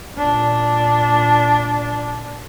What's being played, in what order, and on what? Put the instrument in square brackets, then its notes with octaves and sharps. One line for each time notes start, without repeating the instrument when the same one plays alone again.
[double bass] A#2 D4